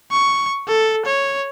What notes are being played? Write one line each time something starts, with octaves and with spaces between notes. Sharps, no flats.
C#6
A4
C#5